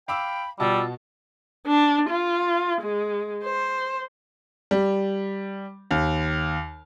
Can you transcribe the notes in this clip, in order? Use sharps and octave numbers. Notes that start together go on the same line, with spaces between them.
F5 G5 B5 D6 E6
B2 G3 F4 F#4 A5 E6
D4
F4
G#3
C5
G3
D#2